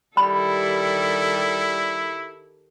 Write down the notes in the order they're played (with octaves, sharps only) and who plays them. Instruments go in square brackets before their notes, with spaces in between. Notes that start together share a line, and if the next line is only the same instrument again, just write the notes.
[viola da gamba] D#3 G4 A4 [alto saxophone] G3 [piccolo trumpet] E4 [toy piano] B5